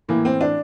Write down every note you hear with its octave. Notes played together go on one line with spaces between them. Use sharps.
A2 E3 A#3
C4
D4